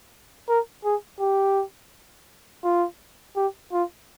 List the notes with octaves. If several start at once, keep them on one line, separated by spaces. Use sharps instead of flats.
A#4
G#4
G4
F4
G4
F4